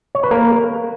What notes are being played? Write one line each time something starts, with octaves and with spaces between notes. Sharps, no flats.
C#5
B4
A#3 A#4